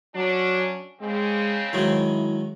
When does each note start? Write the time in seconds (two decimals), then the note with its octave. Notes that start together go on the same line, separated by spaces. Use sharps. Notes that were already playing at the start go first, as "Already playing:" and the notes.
0.16 F#3 C#4 D4
1.01 C#3 G#3 C4
1.73 D#3 F#3 G#3 E4